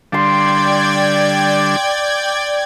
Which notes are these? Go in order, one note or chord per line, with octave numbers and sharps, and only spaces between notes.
D3 G3 D4 D5 F5 G5 C6 G#6